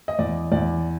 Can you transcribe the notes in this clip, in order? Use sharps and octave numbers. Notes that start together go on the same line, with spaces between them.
D#5
E2 D5
E2 D5